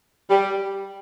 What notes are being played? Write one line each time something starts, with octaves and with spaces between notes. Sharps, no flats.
G3